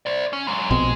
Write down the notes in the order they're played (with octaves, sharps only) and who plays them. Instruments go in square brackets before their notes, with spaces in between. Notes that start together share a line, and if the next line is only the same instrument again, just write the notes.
[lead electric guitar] C5 D5
C#4
F#3 G#3
[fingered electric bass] A#1 B2 C4 [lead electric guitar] G#3